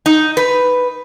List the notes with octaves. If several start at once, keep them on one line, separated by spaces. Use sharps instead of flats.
D#4
B4